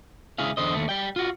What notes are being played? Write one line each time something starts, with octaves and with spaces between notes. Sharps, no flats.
C#2 E4 G#4 F5
E2 D3 C5 D#5
D#2 A3
G3 G5
F4 F#4